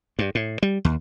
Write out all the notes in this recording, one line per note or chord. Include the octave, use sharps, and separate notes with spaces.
G2
A2
G3
D#2